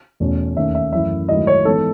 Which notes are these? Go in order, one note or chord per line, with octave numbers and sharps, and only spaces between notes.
E2 B2 A3 C#4
D#2 D#3 A3 C#4 E5
E5
F#2 E3 A3 E4 E5
G#2 D#3 F#3 A3 E4 D#5
C#5
G#2 E3 B3 D#4 A4